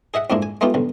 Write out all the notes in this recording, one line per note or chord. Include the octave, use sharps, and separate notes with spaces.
G#4 D#5 E5 F#5
F2 G#2 G#3 A#3 D4 E4
G#5
G#3 A3 B3 D#4 F4 G4
B1 D3